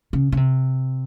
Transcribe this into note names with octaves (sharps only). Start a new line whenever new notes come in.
C#3
C#3
C3